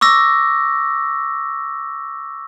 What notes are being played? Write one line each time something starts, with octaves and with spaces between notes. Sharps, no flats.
C#6 D6 E6 A#6